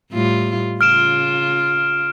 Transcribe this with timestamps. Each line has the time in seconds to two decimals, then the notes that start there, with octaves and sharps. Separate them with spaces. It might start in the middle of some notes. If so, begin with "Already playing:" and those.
0.12 A2 G3 F4
0.81 C#3 F4 F6 D7 E7